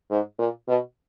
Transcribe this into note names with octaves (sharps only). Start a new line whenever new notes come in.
G#2
A#2
B2